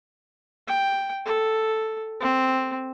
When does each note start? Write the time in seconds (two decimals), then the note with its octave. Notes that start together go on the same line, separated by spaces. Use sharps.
0.68 G5
1.26 A4
2.20 C4